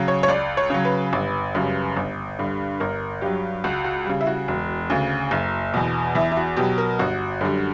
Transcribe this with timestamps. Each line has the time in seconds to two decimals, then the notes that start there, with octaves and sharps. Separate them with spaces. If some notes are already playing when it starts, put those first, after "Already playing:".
Already playing: C#3 F#3
0.08 C#5
0.23 C#5
0.28 C#2 D5
0.57 C#5
0.70 C#3 F#3
0.85 B4
1.13 G1
1.55 F#2 C#3 G3
1.97 G1
2.39 G2 D3 G3
2.80 G1 A#4
3.21 G2 F#3 G4
3.64 C#2 F#4
3.84 F#4
4.06 C#3 G3
4.21 E4
4.27 F#4
4.48 E1
4.90 D2 C#3
5.31 F#1
5.74 E2 B2
6.15 E2 E4
6.31 E4
6.37 F#4
6.57 B2 F#3 G4
6.78 A#4
6.99 G1 F#4
7.41 F#2 D3 G3